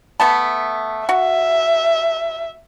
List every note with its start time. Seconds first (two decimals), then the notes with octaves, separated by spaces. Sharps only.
0.20 A3 B3 A5
1.09 F#4 E5